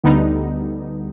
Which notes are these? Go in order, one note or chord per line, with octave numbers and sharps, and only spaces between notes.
D2 D3 G3 B3 D#4